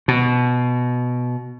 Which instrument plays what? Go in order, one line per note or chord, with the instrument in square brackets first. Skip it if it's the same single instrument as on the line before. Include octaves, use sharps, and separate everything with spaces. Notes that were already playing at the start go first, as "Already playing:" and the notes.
[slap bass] B2